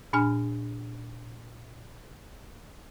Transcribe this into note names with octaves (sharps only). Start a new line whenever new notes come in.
A#2 D4 G#5 F6